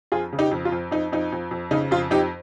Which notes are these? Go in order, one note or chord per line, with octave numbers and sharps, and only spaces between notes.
F2 F4 G#4
C#3
D#4 G4
F2
F4
F2
F2 D#4
F2 D#4
F2
F2
C#3 D#4
F2 F4
F2 D#4 G4